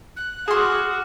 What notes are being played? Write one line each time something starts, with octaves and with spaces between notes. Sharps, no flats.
F#6
F#4 G#4 C6 D6 F6 E7